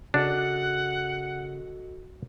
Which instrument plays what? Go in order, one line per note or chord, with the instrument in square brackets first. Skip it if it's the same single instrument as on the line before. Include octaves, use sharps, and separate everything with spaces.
[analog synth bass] C#3 [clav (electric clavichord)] D4 [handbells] F#4 A4 D#5 [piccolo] F#5